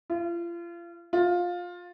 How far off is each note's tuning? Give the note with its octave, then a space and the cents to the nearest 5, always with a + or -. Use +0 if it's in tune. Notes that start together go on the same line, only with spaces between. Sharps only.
F4 -35
F4 +15